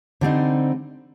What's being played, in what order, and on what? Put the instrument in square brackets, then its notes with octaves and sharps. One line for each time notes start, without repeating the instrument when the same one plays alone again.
[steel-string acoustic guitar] D3 G3 C4 D#4